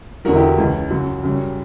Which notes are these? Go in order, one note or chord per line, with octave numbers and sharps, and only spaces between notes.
E2 D3 F#3 F#4 A#4
E4 G4
F#4
C#2 C#3 E3
F#2 C#3 F#3 F#4
F#2 C#3 G3